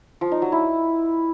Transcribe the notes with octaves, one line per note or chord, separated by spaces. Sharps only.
F3
D#4
F#3
E4